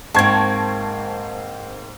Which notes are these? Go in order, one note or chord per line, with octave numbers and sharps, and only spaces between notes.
G#2 A#3 C4 A5 C#6 G#6